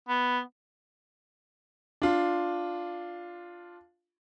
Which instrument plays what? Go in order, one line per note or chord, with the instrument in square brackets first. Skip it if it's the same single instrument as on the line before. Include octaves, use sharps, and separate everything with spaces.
[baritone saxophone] B3
[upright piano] D4 F4